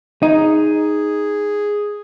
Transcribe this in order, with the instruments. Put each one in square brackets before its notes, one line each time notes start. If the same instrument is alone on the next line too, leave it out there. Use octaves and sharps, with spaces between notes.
[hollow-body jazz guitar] D#4 [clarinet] G#4